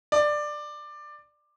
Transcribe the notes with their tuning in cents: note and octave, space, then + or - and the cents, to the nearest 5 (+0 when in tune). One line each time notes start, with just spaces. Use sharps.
D5 +15